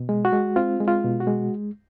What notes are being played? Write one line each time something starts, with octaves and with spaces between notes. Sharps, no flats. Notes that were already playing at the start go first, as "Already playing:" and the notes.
Already playing: B2
G#3
F#4
G#3
C4 F4
G#3
F4
B2
F#4
G#3